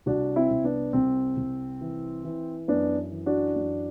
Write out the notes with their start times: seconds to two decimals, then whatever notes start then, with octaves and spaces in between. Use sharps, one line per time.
0.06 C2 D4 F#4
0.36 C4 E4
0.50 C2
0.64 B3 D4
0.93 C2 C4
1.37 C2
1.81 E3
2.25 E3
2.68 F#2 B3 D4
3.11 E3
3.26 D4 F#4
3.56 F#2